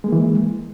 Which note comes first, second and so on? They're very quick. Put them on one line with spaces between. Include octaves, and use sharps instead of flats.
G#3 A#3 E3